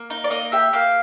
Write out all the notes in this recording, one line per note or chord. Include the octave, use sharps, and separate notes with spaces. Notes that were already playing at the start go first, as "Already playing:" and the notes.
Already playing: A#3
D#4
D5
A#3 D#5
G4 E5
A#3 F5